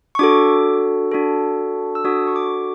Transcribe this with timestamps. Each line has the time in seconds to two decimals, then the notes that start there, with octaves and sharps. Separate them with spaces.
0.15 C#6
0.19 D4 F#4 A4 D6
1.12 D4 F#4 A4
1.95 E6
2.04 D4 F#4 A4 D#6
2.27 C#6
2.36 D6